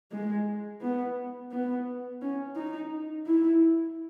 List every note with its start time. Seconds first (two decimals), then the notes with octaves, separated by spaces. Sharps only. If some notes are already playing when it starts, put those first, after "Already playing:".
0.12 G#3
0.82 B3
1.52 B3
2.22 C#4
2.56 D#4
3.27 E4